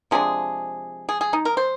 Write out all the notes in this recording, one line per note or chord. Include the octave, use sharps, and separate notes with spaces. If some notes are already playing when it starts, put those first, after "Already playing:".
C3 F3 G#3 D4 G#4
G#4
G#4
D#4
A#4
C5